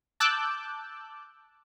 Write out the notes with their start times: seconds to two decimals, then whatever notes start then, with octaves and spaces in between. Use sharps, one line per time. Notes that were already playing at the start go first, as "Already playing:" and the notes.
0.20 A5 D6 E6 F#6 G6